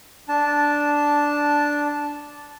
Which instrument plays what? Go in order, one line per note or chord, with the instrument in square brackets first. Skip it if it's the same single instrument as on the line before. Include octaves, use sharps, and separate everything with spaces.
[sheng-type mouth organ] D4 A5